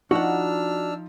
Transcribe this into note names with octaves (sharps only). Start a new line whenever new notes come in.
F3 D4 D#4 F#4 F#5 E6 F6